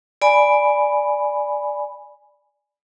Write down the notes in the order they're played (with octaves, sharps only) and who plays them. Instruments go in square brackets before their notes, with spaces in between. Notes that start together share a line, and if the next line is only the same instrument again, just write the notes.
[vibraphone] D5 G#5 B5